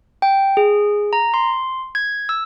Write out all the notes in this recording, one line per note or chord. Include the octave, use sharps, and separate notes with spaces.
G5
G#4
A#5
C6
G#6
E6